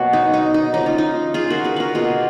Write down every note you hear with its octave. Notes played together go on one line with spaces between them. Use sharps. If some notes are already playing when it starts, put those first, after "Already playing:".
Already playing: B2 F#3 A#3 F#4
D#4
D#4
D#4
C#3 F3 A#3 D#4
F4
D#4
F4 G#4
F#4 A#4
G#4 B4
F#4 A#4 B4
B2 A#3 F4 G#4